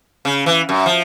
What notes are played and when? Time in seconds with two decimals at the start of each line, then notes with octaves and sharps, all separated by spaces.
0.25 C#3
0.46 E3
0.69 F#2
0.86 F3